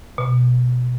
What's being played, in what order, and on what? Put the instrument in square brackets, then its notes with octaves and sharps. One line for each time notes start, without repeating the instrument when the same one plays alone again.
[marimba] B2